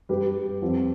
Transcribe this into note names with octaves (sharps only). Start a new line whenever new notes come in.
G2 G4 B4
G3
F2